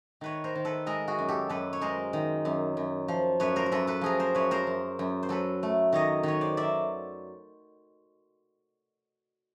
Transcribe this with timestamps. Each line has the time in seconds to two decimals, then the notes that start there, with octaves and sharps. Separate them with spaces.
0.21 D#3 B4 C#5
0.44 A#4 C5
0.55 D#3
0.65 A4 B4
0.86 G#3 G#4 A#4
1.08 F#4 G#4
1.19 F#2
1.28 G4 A4
1.49 F#2 A4 B4
1.73 C#5
1.81 G#3 A#4 C5
2.13 D#3
2.45 F#2
2.77 F#2
3.08 F3
3.40 F#2 B4 C#5
3.56 A#4 C5
3.66 A#4
3.72 F#2 A4 B4
3.87 A4 B4
4.01 F3 G#4 A#4
4.19 A#4 C5
4.35 F#2 B4 C#5
4.51 A#4 C5
4.67 F#2
4.99 F#2
5.23 C5
5.29 F#3 A4 B4
5.63 A3
5.93 D#3 C#5 D#5
6.23 D#3 B4 C#5
6.41 C5 D5
6.57 F#3 D5 E5